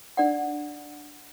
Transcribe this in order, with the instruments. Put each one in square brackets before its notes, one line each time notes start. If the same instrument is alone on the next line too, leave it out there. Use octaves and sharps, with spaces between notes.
[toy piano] D4 D5 F#5